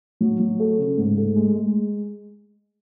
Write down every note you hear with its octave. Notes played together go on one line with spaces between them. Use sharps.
F#3
F#3
A3
C#3
G#2
A3
G#3
G#3